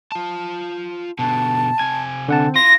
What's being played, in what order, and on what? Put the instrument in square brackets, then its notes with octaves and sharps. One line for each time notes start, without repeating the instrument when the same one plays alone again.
[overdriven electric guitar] F4 A5
[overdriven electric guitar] B2 D3 [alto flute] A5
[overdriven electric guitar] C3 G#5 [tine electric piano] G#6
[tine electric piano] D3 F#5 A5 [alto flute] C4
[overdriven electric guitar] E4 F4 [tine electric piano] C6 [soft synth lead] A#6